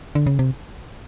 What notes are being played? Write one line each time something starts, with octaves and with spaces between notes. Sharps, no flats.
D3
C#3
C3